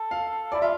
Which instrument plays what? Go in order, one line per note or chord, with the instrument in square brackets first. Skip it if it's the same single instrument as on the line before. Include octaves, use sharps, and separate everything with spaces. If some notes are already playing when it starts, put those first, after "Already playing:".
Already playing: [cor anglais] A4
[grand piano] F5
[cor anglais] E4 [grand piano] D5
[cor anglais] F4 [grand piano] E5